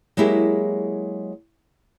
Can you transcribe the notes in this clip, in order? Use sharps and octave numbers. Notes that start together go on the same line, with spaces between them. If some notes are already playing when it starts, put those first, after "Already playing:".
F#3 G#3 A#3 E4 G4 G#4